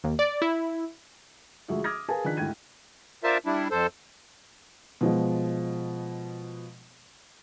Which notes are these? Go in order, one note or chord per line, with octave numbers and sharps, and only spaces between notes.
D#2
D5
E4
D2 F3 G#3 F#4 G#4 E5
D6 D#6 F6 G#6 A#6
G#4 A#4 B4 F5 G#5 A5
D#3 F3 D4 F#6 B6
D2 G#2 E4 G5 G#6 D#7
D4 F4 A#4 C5 E5 A5
G3 D4 E4
F2 A4 C5
B2 F3 G#3